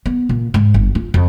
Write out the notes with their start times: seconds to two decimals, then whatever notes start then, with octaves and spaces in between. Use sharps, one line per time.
0.06 B3
0.29 A#2
0.54 G#2
0.74 G1
0.95 F4
1.14 F2